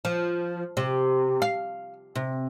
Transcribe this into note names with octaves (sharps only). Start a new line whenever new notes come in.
F3
C3
F5
C3